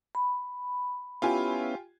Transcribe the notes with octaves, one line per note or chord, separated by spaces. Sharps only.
B5
B3 C#4 E4 F4 G4 G#5